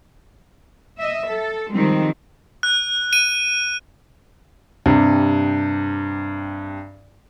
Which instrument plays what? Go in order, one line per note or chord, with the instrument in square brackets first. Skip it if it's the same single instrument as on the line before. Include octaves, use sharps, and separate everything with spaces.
[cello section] D#5 E5
A4
D#3 F3 G3 G#3 C4
[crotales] F#6
D#7
[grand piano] G2 C3